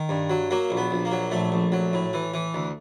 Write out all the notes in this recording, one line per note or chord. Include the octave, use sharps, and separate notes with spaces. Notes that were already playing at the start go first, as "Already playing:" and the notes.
Already playing: D#3
G2
F#3
F#3 A#3
A#1
B3
A#1
A#3
F#3
A#1 A3
A#1
F#3
A2
E3
E3
D2